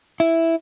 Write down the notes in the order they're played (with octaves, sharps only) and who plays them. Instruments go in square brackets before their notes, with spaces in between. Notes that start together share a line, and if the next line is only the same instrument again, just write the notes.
[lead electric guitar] E4